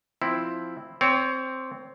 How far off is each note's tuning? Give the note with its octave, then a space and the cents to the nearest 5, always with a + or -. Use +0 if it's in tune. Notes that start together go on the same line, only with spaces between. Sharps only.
F3 +0 C4 +0 E4 +0
C4 +0 C#5 +25